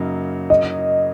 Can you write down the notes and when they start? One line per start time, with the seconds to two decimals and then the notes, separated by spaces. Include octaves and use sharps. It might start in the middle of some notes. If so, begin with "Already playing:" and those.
Already playing: F#2 C#3 F#3 A#3 D#4
0.50 D#5